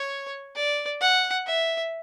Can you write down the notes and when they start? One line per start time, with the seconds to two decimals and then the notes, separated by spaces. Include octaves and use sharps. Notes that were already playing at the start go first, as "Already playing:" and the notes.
Already playing: C#5
0.55 D5
1.01 F#5
1.47 E5